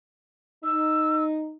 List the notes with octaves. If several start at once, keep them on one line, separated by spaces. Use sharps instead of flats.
D#4 E6